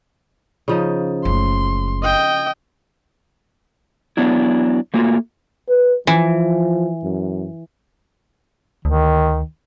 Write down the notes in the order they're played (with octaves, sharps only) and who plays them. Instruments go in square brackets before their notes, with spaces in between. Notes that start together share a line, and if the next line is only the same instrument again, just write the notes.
[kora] C#3 F3 D#4
[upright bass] F#1 A3 [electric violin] C6
[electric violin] D#5 G5
[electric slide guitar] F#3 B3 D4 E4
A3 A#3 F4 F#4
[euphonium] B4
[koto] E3 [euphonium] F3
[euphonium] F#2
[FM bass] D2 [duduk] D#3